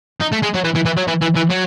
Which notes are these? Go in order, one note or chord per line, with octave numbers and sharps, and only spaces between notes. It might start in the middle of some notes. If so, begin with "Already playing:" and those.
D#4
A3
G#3
F#3
E3
E3
E3
F#3
E3
E3
E3
F#3